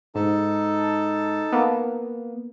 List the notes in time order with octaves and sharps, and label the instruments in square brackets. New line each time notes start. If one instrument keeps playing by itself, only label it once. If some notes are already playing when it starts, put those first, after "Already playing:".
[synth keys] G#2 [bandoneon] D#4 A4 A5
[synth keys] A#3 B3